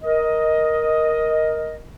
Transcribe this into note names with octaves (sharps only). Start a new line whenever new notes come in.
A#4 D#5